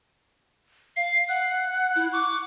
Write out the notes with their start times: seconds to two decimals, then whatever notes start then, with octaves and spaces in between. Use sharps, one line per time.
0.96 F5 C7
1.29 F#5 F#6
1.96 E4
2.13 C#6 D6